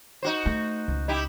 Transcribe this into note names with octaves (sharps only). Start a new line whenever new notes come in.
D#4 F#4 C5
A3
C#2
D#4 E4 G4